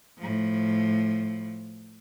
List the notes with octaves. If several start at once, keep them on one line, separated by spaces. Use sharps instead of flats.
A2 F3